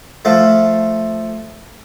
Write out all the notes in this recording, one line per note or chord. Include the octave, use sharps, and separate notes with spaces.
F3 A3